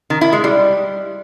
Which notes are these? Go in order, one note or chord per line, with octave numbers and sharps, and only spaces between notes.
D#3
E4
G#3
G3